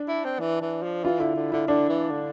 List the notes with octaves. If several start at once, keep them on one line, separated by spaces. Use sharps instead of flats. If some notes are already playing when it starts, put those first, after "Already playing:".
Already playing: D4
E4
C4
E3
E3
F3
E3 F4
D3 E4
D3
D3 E4
D3 D4
E3
D3